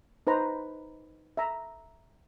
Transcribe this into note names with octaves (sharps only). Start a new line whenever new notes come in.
D#4 B4 C5 A#5
E5 A#5